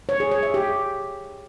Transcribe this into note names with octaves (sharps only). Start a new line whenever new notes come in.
C#5
G#4
C#5
E5
G4